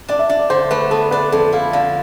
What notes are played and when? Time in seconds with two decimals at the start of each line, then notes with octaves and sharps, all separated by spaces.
0.08 D4 D5
0.19 E5
0.29 D4 E5
0.39 D5
0.50 D3 C5
0.71 A3 B4
0.91 B3 A4
1.11 D4 B4
1.32 F2 A4
1.52 E4 F5
1.73 D3 F5